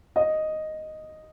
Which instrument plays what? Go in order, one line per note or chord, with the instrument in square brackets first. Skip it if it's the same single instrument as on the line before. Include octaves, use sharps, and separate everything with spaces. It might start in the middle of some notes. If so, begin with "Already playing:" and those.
[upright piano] D#5